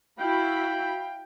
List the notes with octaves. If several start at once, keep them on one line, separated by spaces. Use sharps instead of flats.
E4 F#4 F5 G5 B5